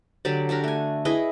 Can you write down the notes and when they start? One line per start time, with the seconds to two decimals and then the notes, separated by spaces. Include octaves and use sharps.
0.25 D3 F#3 G4 D5
0.49 D4 F#4 G4 A#4
0.64 A3 G#5
1.05 E4 G#4 B4 D#5